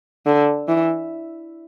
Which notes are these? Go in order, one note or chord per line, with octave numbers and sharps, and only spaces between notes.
D3
E3